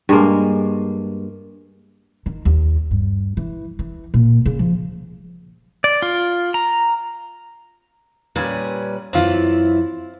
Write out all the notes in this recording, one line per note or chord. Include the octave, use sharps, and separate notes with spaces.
G2 G#3 A#3
D#3
D#2
G2
E3
E3
A#2
C#3
F3
D5
F4
A#5
A#2 G3 C#4 B4
F#2 E3 C4 E4 F4